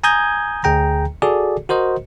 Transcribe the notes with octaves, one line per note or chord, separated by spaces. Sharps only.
G#5 A#5 D#6 G6 G#6
D2 G#4 G5 A#5
F#4 G#4 A4 D5
F#4 A#4 C5 D#5